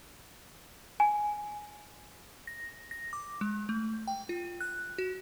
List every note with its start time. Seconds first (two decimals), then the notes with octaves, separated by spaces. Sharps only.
1.00 G#5
2.47 A#6
2.91 A#6
3.13 D6
3.41 G#3
3.69 A3
4.07 G5
4.29 F4
4.61 F#6
4.98 F#4